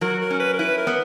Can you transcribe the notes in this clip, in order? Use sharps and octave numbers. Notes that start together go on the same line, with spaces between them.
F#3 A#4
A#4
C#4
B4
A#4
E4 B4
A#4
B3